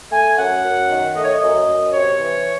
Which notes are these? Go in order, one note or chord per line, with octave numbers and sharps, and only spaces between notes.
A3 G#5
F#2 F#5
F#2
D#3
A3 D#5
C#5
D#5
F#2
F#2
C3 C#5
E3